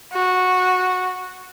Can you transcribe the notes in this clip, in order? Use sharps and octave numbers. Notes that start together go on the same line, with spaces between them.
F#4